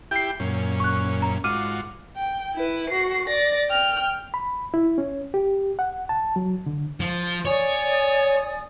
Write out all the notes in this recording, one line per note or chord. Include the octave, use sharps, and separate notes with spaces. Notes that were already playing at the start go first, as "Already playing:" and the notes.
E4 G4 G5 G6 C7
F#2 A#2 C#4
C#6 F#6
A#5
G#2 F4 F#4 D6 F6 D#7
G5
E4 B4
F#4 C7
D5 A#6
G5 F6
B5
E4
C#4
G4
F#5
A5
F#3
D3
F3
C#5 D5 G#5 D#6